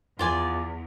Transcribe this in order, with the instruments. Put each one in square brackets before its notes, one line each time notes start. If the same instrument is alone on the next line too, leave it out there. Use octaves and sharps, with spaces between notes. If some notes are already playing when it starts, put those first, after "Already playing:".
[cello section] E2 [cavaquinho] F4 D5 G#5